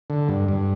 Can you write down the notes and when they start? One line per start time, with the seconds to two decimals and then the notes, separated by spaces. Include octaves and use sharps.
0.10 D3
0.29 G2
0.48 G2